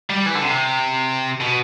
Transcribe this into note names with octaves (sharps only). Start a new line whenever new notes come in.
G3
E3
D3
C3
B2